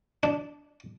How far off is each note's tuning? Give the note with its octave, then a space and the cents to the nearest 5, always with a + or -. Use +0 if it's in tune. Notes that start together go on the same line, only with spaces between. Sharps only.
D4 -10